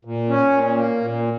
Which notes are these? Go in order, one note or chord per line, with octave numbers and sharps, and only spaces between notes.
A#2
C#4
A#2
A#3
A#2